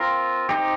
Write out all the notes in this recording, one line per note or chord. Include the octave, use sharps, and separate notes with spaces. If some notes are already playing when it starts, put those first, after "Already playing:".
Already playing: C4 F4 A#4
C4 D#4 G4